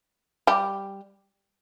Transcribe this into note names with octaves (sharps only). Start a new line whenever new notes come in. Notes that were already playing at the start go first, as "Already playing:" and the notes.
G3 G4